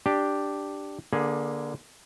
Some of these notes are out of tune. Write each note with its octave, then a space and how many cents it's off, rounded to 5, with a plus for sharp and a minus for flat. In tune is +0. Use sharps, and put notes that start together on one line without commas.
D4 +0 G4 +0
D3 +0 A#3 +30 G#4 +0